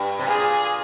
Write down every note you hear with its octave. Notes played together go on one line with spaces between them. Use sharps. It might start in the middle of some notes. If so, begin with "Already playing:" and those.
Already playing: G2
C3
A#2 G#4